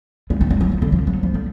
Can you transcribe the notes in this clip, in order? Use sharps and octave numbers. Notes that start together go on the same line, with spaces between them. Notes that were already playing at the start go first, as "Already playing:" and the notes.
G#3
A3
G#3
F#3
F3
D3
F3
F#3
F3
D3